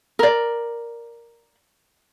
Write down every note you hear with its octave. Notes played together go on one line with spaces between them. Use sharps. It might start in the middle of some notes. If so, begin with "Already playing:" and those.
A#4 D5